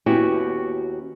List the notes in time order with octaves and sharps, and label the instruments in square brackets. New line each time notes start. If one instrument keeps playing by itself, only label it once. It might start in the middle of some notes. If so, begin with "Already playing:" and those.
[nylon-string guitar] D#2 B3 C#4 E4 F#4 G4